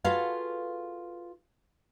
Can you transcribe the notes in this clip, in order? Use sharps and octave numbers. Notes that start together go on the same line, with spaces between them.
F4 F#4 G#4 A4 B4 F5